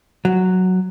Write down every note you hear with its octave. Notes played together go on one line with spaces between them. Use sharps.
F#3